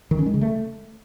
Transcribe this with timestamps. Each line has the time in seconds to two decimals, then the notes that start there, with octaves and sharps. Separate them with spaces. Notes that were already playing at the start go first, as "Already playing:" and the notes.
0.11 D#3
0.19 C#4
0.26 G#3
0.34 C#3
0.41 A3